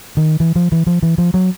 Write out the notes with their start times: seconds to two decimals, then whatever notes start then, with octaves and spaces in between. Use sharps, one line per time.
0.17 D#3
0.40 E3
0.56 F3
0.72 E3
0.87 F3
1.03 E3
1.18 F3
1.34 F#3